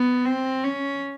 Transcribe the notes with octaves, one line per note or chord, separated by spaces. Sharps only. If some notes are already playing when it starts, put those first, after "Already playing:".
Already playing: B3
C4
C#4